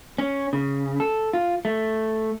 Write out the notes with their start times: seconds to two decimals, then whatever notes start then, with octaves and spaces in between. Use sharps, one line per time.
0.18 C#4
0.53 C#3
1.00 A4
1.33 F4
1.65 A3